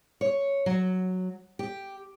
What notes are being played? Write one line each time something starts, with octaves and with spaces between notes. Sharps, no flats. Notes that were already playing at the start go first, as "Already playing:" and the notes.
C#5
F#3
G4